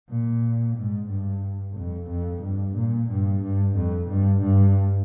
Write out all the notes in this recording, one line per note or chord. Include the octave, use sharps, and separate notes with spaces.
A#2
G#2
G2
F2
F2
G2
A#2
G2
G2
F2
G2
G2